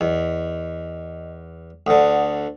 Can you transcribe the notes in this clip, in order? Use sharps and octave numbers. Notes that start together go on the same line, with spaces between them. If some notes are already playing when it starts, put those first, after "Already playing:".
E2 D#5
D2 D3 F#5 D#6